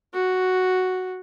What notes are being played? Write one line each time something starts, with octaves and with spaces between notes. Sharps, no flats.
F#4